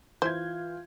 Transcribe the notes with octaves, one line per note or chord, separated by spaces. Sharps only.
E3 F4 C5 G6 G#6